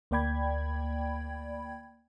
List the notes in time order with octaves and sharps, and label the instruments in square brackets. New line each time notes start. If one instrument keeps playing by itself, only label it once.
[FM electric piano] D2 A#3 D5 G5 B5 G#6